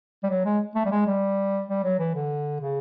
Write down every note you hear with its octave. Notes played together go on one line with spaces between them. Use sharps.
G3
F#3
G#3
A3
G3
G#3
G3
G3
F#3
E3
D3
C#3